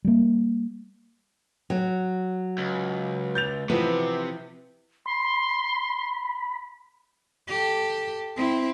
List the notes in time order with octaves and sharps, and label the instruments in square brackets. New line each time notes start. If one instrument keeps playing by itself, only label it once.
[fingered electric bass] G3 A#3
[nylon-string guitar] F#3
[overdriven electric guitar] C#2
[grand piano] G6 A6 F7
[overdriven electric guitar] C3 [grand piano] E3 F3 [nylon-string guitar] B3
[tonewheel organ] B5 [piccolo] C6
[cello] G4 A4
C4 E4